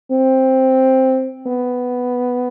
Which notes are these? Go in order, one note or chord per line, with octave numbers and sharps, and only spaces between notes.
C4
B3